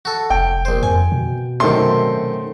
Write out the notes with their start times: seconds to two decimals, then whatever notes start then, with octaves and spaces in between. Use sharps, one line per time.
0.05 F#4 A4
0.30 F1 G5
0.65 A#1 C5
0.83 F2 G#5
1.12 B2
1.60 F#2 C3 D#3 A3 C6